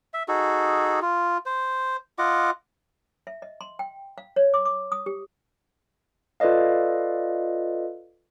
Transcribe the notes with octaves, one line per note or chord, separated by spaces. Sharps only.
E5
D#4 F#4 G#4 A4
F4
C5
F4 D#5 F#5 D6
E5
D#5
C6
G5
F5
C#5
D6
D6
D#6
G4
F4 A4 B4 D5 D#5 F5